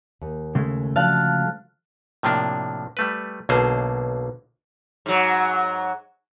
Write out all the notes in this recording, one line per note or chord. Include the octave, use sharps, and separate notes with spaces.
D#2
C#3 G#3 A3
D3 F3 F#3 F5 A5 F#6
A2 C3 F3 A#3 D4
G3 A3 B4
B1 B2 D3 A#3 G#4 C5
G#2 F#3